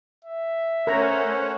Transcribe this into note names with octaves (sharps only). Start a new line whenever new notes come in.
E5
A3 C#4 A#4 C5 C#5 F#5 A#5